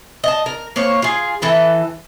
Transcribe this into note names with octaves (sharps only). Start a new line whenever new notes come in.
D#5 A5
A#4
A#3 C5 C#5
F4 G#4
E3 A4 B4